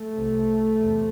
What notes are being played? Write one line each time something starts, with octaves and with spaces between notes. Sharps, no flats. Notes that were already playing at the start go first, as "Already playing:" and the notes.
Already playing: A3
C2 C3
E2 C3